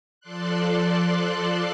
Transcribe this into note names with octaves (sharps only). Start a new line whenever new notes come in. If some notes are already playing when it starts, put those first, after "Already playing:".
F3 A4 D5 C6 F#6